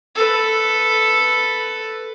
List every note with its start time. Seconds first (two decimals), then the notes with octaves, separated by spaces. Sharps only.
0.16 A4 B4